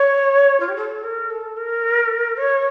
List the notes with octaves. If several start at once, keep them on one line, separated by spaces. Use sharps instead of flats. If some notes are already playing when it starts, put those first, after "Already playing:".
Already playing: C#5
F4
G4
A4
A#4
A4
A#4
C#5